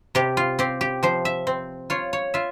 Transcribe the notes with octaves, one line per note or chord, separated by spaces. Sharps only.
C3 G4
F4
C4 G4
G4
F3 C5
E5
C4
F4 C#5
C#5
F4 E5